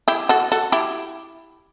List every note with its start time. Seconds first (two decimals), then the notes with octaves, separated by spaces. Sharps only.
0.08 E4 G4
0.29 F#4 A4
0.52 F#4 A4
0.72 E4 G4